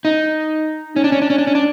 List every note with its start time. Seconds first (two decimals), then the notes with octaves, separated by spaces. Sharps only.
0.05 D#4
0.96 C#4
1.04 D4
1.12 C#4
1.22 D4
1.30 C#4
1.38 D4
1.47 C#4
1.55 D4